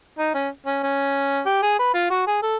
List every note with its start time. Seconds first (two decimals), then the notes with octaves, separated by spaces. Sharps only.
0.19 D#4
0.34 C#4
0.67 C#4
0.83 C#4
1.46 G4
1.63 G#4
1.79 B4
1.94 F4
2.10 F#4
2.27 G#4
2.43 A4